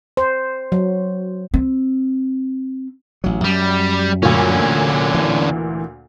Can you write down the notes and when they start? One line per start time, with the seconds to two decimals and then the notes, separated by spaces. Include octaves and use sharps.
0.17 C5
0.72 F#3
1.54 C4
3.24 A1 F#3
3.44 F#2 G3
4.23 D2 A#2 D3 C#4
5.14 E3